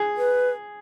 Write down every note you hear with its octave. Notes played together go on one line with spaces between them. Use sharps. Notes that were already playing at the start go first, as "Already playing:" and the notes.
Already playing: G#4
B4